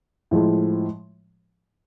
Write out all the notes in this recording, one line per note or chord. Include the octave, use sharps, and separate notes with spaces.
A2 F3 G#3